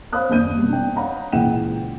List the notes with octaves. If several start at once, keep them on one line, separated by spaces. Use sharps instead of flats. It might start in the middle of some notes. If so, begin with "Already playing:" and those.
C5 C#5 F5 B5 D#6 F#6
F#1 D#2 D4 G6 D#7
B2 G3
D4 D#4 G5
C#5 F5 F#5 A#5 B5
C#2 A#2 E3 F#5 G5 E7